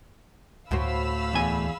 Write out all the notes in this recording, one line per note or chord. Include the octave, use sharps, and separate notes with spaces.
D2 A2 F#4 C5 F5 B5 E6
E2 G#5